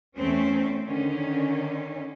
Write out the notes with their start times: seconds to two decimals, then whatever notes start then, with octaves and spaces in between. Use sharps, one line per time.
0.15 E2 A3 C4 C#4
0.87 D3 D#3 C#4